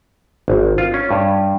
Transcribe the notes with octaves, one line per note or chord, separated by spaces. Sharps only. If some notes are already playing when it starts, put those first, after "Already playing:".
G#1
F4
C#4
G2